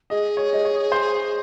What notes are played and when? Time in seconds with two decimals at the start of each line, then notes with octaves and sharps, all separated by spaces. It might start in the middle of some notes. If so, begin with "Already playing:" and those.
0.10 G#4 D#5
0.37 C#5
0.53 D#5
0.65 C#5
0.92 C5